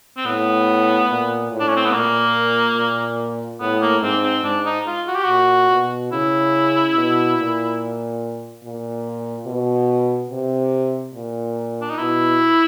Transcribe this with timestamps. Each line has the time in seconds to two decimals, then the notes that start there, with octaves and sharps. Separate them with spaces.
0.17 C4
0.25 A2 B3
1.10 A#2
1.52 A2
1.60 D4
1.68 C#4
1.76 C4
1.85 B3
1.93 A#2 A#3
2.76 A#2
3.60 A2 B3
3.81 A#3
4.02 G#2 C4
4.23 C4
4.44 G#2 D4
4.65 D#4
4.87 F4
5.07 F#4
5.15 G4
5.24 A#2 F#4
5.70 B2
6.12 C#3 E4
6.95 B2
7.37 A#2
8.64 A#2
9.46 B2
10.31 C3
11.14 A#2
11.81 D4
11.89 D#4
11.98 B2 E4